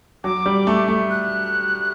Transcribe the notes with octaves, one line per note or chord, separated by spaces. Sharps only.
F#3 D6
G3
A3
A3
F#6